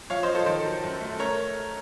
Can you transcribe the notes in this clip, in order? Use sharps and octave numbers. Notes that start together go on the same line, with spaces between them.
F3 C#5 F5
C5 D#5
F3
A4 C5
D#3 A4 C5
F#3
F#2
A3
A3 A#4 C#5